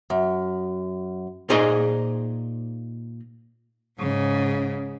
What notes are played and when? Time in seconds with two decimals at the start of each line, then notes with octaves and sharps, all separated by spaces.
0.10 F#2
1.50 A#2 D#4 G#4 C5 D#5 A#5
3.99 G#2 C#3